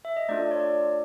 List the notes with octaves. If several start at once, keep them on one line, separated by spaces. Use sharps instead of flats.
E5
D#5
A3 D4 F4 A4 D5
C#5
D5